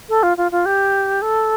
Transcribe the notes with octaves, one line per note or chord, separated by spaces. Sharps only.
A4
F4
F4
F4
G4
A4